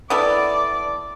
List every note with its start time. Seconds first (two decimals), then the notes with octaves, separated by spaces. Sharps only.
0.10 B3 E4 A4 D5